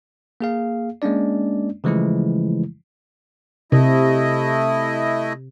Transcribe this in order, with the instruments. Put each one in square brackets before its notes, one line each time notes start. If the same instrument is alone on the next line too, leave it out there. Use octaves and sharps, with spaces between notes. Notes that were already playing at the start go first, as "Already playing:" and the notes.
[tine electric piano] A#3 G#4 F5
G#3 A#3 C#4 D4 D5
C#3 E3 F3 G#3 A3 E4
[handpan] C3 [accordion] A3 E4 D#5